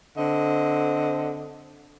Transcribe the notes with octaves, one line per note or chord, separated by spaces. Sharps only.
D3 C4 D#5